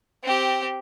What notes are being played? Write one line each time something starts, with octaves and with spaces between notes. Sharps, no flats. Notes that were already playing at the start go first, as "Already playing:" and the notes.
C4 G4